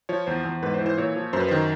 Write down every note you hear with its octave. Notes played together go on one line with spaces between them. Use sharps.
F3 C#5
E2 C5
E2
G#2 B4
C5
E3
C5
A#2 C#5
F3
F#2 C5
B4
D#3 C5